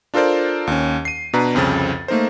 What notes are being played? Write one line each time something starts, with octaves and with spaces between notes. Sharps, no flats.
D4 F4 A4 A#4 C5 D5
D#2 C#4
C7 D#7
B2 D4 B4 A#5
C2 F2 C#3 C4 A6
A3 A#3 D#4 A#4 C5